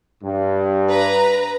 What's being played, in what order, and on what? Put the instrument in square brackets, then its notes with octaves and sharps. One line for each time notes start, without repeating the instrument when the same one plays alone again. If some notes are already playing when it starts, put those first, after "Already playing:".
[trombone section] G2
[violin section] B4 A#5